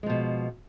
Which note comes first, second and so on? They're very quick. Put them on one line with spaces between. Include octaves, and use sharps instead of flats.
G#3 F3 B2